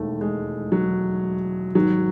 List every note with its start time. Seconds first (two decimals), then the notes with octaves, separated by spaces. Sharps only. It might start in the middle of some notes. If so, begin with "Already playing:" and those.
Already playing: E1 D#2 D#3 A3
0.21 G#3
0.72 F#3
1.75 G#1 G#2 D#3 F#3